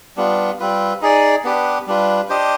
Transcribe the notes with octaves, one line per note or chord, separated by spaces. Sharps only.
G3 B3 D4 F4
G3 C4 F4 B4
D#4 G#4 D5
B3 D4 G4 B4
G3 D4 F4 B4
D4 G4 C5 D#5